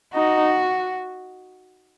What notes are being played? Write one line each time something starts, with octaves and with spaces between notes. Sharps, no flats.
D#4 F#4